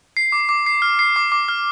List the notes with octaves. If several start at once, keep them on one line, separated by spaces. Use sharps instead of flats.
C7
D6
D6
C7
F6
C7
D6
D6
F6